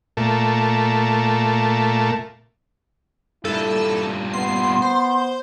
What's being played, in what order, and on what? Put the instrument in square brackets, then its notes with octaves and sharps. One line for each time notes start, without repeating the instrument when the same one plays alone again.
[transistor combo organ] A#2 A3
[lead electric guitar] G2 A#2 [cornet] E4 [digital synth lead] A4
[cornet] B3 [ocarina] C6 [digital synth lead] C7
[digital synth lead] C5